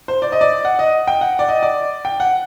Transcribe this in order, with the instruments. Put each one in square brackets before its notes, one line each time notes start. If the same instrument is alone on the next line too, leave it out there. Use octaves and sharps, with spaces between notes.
[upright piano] C5
D5
D#5
D5
F#5
D#5
G5
F#5
D5
D#5
D5
G5
F#5